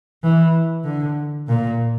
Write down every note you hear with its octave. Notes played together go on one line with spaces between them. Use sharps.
E3
D3
A#2